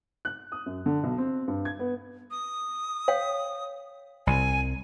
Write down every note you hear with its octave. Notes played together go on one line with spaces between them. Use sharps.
F#6
D#6
F#2
D3
B1
C4
G2
G#6
B3
D#6
C#5 F5 G5
C2 G#5